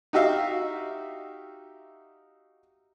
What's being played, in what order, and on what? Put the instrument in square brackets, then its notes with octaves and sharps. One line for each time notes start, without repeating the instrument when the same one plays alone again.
[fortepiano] D#4 F#4 G4 E5 F5